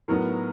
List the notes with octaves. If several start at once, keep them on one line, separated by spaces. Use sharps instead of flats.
A2 F#3 B3 D#4 A#4